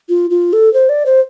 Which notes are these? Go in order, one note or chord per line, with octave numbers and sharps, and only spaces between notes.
F4
F4
A4
C5
D5
C5